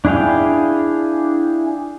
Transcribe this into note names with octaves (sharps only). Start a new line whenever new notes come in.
D4 E4 G#4 F5 G5